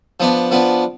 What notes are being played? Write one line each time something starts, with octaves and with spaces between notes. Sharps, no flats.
F3 B3 D4
F3 B3 D4